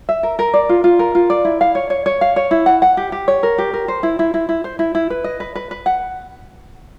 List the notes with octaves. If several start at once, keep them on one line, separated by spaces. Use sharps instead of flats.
E5
A#4
A#4
D5
F4
F4
A#4
F4
D5
E4
F5
C#5
C#5
C#5
F5
C#5
E4
F#5
F#5
G4
G4
C#5
A#4
G4
A#4
C5
E4
E4
E4
E4
C5
E4
E4
B4
D#5
B4
B4
B4
F#5